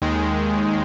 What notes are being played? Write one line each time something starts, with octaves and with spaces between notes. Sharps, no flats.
D#2 D#3 G#3